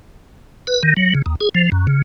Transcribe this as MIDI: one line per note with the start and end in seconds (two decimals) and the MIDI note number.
0.67 0.83 71
0.83 0.94 51
0.97 1.14 54
1.15 1.22 49
1.26 1.35 39
1.41 1.49 68
1.55 1.70 53
1.72 1.87 42
1.87 2.02 49